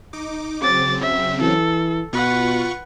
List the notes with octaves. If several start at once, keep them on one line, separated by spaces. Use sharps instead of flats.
D#4 D6
C#3 F#3 C4 D6 A6
E5
E3 A4
B2 F4 B4 F#5 C#6